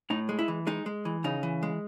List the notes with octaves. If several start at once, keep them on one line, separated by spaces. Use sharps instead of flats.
A2 D#4
G#3
E4
E3
G#3 D#4
G#3
E3
C#3 D#4
E3
G#3